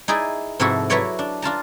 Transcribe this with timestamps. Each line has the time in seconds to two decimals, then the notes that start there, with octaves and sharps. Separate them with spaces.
0.08 D#4 E4 G#4 D5
0.60 G#2 C3 F3 E4 F#4 A4
0.90 F#3 E4 F#4 B4 C#5 D5
1.19 D4
1.42 D4 F4 A5 A#5